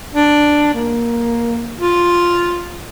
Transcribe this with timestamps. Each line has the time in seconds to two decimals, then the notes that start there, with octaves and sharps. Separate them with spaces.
0.15 D4
0.74 A#3
1.80 F4